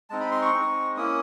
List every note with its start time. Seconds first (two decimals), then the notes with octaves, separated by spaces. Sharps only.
0.10 G#3 C4 D#4 A5
0.21 B5
0.31 C6
0.42 C#6
0.54 G#3 C4 D#4
0.97 A#3 C#4 E4 D#6